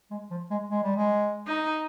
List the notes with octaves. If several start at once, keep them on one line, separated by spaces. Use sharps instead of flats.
G#3
F3
G#3
G#3
G3
G#3
D#4